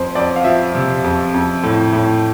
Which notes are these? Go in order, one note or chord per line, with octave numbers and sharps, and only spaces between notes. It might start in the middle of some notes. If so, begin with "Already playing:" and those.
Already playing: F2 C5
F2 D5
F5
F3 E5
C3
F2
F2
A2
A2